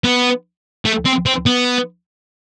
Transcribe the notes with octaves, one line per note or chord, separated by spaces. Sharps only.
B3
A3
C4
C4
B3